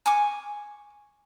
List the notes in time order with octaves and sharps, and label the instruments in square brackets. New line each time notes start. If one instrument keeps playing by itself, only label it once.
[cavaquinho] G#5 C#6 D6